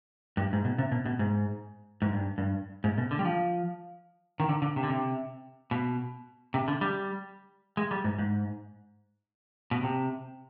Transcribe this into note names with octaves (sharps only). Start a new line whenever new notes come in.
G2
G#2
B2
C3
B2
B2
G#2
G#2
G2
G2
G#2
B2
D3
G3
F3
D#3
D3
D3
C3
D3
C3
B2
C3
D3
G3
G#3
G3
G#2
G#2
B2
C3